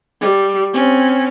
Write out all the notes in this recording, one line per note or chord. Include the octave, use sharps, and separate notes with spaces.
G3
C4 C#4